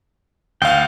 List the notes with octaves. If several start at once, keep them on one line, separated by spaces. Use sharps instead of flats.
D2 F5 G5